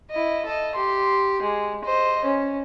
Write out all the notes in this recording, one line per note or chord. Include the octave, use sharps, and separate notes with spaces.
E4 D#5
A4 D#5
G4 C6
G#3
C5 D#5
C#4